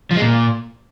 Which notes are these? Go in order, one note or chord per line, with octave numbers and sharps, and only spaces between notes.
F3
G#3
A#2